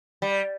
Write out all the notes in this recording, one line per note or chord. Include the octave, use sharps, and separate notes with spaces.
G3